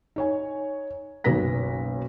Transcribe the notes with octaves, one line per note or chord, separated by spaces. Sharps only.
D#4 C#5 G#5
F#1 B1 D#3 B4 A#6 B6